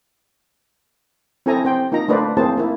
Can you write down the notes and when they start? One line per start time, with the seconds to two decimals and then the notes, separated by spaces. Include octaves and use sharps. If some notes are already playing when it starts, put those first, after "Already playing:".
1.46 C4 E4 A4 G#5 A#5
1.65 C4 C5 G5
1.92 A#3 D#4 F4 A#5
2.08 A3 A#3 D4 B4 C5 D5
2.37 A#3 C4 E4 G#4 C5 A5
2.57 A#3 E4